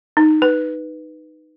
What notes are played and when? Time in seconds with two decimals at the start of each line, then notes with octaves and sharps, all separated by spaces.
0.17 D#4
0.42 B4